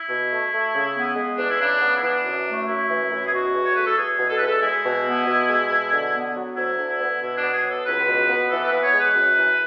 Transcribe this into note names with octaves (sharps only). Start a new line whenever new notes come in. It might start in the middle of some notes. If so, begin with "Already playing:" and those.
Already playing: E4
B2
A3
A3
C#3
B3
G#3
E2 D4
E4
C#3 D4
B3
E4
E3 D4
F#2
A3
F#2 E4
E3
F#2
G#4
B2 F#4
E2
C#5
A3 B4
A4
E2 G#4
B2
A4
E2 B4
A4
G#3 E4
B2
B3
B2
G#3
B2
D3
B3
F#3
D2 E4
D3
E4
B3
B2 E4
B3 D4
G#4
F#3
A4
C#2 B4
B2
B3
E3 A4
A4
B4
B3
C#5
G#3
B4
F#2
E3